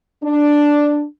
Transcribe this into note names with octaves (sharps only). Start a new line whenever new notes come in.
D4